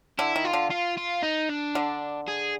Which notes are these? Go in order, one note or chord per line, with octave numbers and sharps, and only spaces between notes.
D3 E4
D#3
F4
D3
F4
F4
D#4
D4
D3
G#4